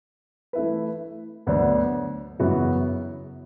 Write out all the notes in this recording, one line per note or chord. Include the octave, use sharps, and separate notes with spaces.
E3 A3 E4 B4
D2 D3 F#3 B3 D4
F#2 C#3 E3 B3 F#4